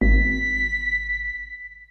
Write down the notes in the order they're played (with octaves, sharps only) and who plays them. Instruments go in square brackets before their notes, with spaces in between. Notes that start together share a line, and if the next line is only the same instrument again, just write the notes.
[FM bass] G#1 [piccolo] B6